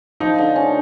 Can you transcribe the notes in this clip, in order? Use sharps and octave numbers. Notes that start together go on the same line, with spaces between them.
F3 D#4
D3
C#4